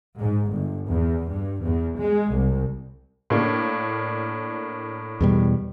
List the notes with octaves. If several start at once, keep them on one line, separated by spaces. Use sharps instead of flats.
G#2
G1
E2
G2
E2
G#3
C2
A2 A#3 D4
E2 B2 G3